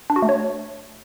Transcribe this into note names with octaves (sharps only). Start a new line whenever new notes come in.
D4
F#4
A3
C#5